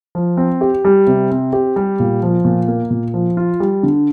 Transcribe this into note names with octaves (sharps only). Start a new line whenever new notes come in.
F3
C4
G4
G3
C3
C4
G4
G3
A#2
F3
A#2
A#3
A#2
F3
F4
G3
D3